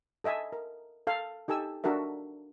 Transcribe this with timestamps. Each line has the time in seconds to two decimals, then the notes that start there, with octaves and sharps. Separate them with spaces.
0.24 A4 D#5 E5 G#5 A5
0.52 A#4
1.07 A4 F5
1.48 D#4 G4 A4 G#5 E6
1.84 D4 F#4 A4 A#4 E5